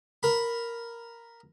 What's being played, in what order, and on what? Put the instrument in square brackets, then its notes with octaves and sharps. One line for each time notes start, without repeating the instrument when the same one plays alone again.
[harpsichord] A#4 B5